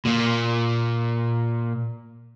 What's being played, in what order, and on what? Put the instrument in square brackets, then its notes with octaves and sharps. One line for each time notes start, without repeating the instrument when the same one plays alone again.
[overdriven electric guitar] A#2 A#3